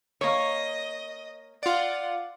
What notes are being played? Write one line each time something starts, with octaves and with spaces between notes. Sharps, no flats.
A#3 C#5 D#5
F4 D5 F#5